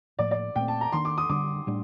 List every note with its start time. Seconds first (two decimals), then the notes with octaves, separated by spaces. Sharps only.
0.19 A2 F3 A#3 D5
0.31 D5
0.56 A#2 A3 C4 G5
0.68 A5
0.81 A#5
0.92 D#3 A#3 D4 C6
1.05 D6
1.18 D#6
1.30 D3 G3 D4 D6
1.67 A2 G3 D4